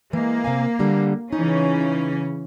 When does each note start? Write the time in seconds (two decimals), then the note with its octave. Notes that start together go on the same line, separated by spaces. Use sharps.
0.13 E3 G#3 A#3
0.44 C3 F5 G#5
0.79 D3 G3
1.33 C#3 E3 C#4 D#4